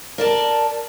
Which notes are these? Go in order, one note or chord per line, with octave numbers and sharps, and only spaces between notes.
A#4 D5 A5